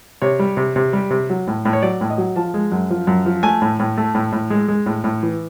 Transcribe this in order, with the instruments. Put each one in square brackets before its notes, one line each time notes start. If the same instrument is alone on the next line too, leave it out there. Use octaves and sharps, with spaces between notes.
[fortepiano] C3 C#5
G3
C3
C3
G3
C3
F#3
A2
A2
C#5
F#3 D5
A2
D#5
F#3
F3 A5
G#3
F#2
F3
F#2
F3
A3 G#5
A2
A2
A3
A2
A2
G#3
G#3
A2
A2
E3